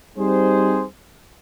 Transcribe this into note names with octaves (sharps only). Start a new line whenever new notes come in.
G3 C4 D#4 G#4 C5